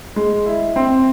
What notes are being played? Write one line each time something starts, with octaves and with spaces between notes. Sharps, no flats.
G#3
E4
C4